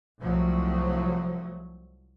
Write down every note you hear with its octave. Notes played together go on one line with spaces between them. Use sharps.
C2 F3 F#3 A3